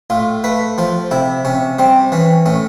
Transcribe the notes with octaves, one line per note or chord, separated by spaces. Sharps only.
A2 F4
A3 B4
F3 F4
C3 E4
C3 C#4
G3 C4
E3 C#4
A2 C#4